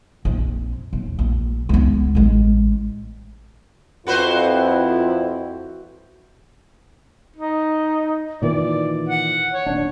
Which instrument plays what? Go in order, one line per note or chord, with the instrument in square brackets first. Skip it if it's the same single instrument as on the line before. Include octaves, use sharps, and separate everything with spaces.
[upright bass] A#1 F2
D#1
A#1
C#2 B3
A1 G#3
[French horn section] F2 [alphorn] E4 [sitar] F#4 B4 C5
[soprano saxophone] D#4
[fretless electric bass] A#2 D#3 E3 [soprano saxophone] D5
[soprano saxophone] F#5
C#5
[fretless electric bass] D#1 D4